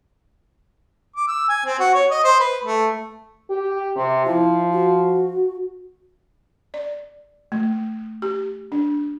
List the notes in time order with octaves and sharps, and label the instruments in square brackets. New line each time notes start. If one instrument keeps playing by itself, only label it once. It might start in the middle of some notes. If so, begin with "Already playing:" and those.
[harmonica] D6
E6
G#5
C4
F#4
C#5
D#5
C5
B4
A3
[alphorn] G4
C3
[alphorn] F3 [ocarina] E4
[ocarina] F#4
[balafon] D5
A3
G4
D4